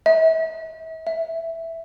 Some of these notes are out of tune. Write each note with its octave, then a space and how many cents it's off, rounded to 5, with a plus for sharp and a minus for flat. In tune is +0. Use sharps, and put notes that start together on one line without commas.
E5 -40
E5 +0